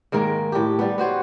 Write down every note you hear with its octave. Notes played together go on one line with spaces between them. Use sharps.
G#2 D#3 G#3 A#3
A2 G4
G3 B3
B3 F#4 C5 C#5